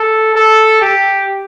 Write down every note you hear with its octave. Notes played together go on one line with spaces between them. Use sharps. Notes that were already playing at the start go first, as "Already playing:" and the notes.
Already playing: A4
A4
G4